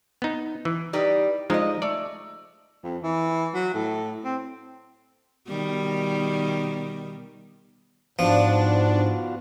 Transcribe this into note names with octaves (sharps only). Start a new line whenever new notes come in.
B3 D#4
E3
G3 D#4 B4
F3 G#3 D#4 D#5
A3 D5
F2
E3
F#3
A2
C4
B2 D#3 G3
G#2 F3 B3 D4 F4 F#4